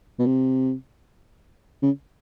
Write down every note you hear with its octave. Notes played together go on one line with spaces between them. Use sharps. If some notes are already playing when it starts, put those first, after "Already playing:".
B2
C3
C#3